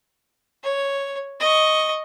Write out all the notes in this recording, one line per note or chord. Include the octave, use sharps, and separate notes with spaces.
C#5
D#5 C#6